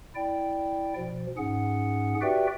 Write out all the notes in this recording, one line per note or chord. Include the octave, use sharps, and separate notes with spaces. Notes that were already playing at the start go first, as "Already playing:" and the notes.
E4 D5 G5
B2 F3
G#2 C#4 G#4 F#5
F#4 G4 B4 D5 E5 G5